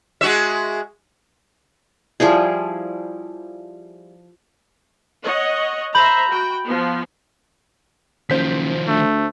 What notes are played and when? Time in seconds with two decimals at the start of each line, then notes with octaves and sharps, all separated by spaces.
0.21 G#3 F#4 E5
2.20 F3 G3 E4 G#4
5.24 C#5 D#5 F#5
5.95 C5 E5 A#5 B5 G6 F#7
6.30 F#4 G5
6.66 F3 B3
8.30 F#1 D#3 F3 C5 G6 B6
8.88 D2 A3